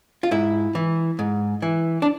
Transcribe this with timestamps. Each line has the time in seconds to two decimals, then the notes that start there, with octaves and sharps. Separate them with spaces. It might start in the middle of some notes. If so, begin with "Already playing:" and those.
0.23 F4
0.31 G#2 E4
0.75 E3
1.19 G#2
1.62 E3
2.02 D4